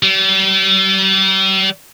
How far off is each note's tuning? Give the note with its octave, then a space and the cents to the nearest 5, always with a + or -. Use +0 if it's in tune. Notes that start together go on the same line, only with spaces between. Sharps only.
G3 -40